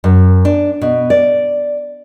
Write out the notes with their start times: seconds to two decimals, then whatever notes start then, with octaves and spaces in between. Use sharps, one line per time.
0.04 F#2
0.45 D4
0.82 B2
1.10 D5